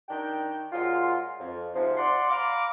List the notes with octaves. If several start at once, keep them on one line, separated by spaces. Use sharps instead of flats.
D#3 D4 G5
A#2 F#3 G#3 F4
F2
G#2 C3 F3
D5 F#5 C6
F5 A#5 B5 D6